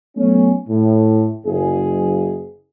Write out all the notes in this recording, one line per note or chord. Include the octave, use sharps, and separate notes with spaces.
F#3 A3 B3 C#4
A2
F#1 G#4